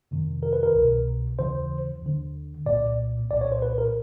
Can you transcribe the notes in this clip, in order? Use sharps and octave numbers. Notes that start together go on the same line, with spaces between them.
F2 C3 D#3
A#4
B4
A#4
C2 B2
D#2 C#3 E3 C5
D#2 D3
C2 A#2 D5
C2 A#2 D5
C#5
C5
B4
A#4